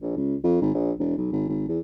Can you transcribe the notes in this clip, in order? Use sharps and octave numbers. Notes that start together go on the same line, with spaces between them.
A#1
C#2
F2
G#1
A#1
E1
B1
G#1
G#1
E2